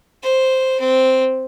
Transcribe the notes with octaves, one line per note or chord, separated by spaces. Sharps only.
C5
C4